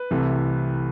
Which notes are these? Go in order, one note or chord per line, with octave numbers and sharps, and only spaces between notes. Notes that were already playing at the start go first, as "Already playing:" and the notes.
Already playing: B4
C2 C3 E3 A3